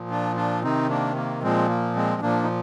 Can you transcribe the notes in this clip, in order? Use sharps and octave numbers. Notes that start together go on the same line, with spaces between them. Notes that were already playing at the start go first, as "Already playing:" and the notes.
Already playing: A#2 F3
D4 F4
D4 F4
C3 D#3 C4 D#4
A#3 D4
A#3
A#2 F3 G#3 C4
A#3
G#3 C4
A#2 F3 A#3 D4
D#4